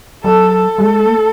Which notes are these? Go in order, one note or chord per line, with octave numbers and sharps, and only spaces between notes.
F#3 A4
A4
G3
G#3
A#3
A3